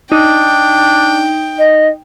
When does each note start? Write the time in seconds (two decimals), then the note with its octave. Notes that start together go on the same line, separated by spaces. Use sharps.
0.12 D4 D#4 G5
1.59 D#5